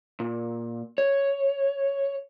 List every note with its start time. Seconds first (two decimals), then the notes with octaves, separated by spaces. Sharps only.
0.20 A#2
0.98 C#5